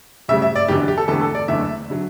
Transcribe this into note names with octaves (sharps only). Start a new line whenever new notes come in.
D2 C#3 G3 E5
E5
D5
F#1 E2 D3 F#3 G4
G4
A4
E1 E2 D3 A3 A4
A4
D5
F#1 E2 D3 A3 E5
D3 F#3